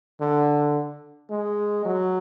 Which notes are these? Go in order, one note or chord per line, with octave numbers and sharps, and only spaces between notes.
D3
G#3
F#3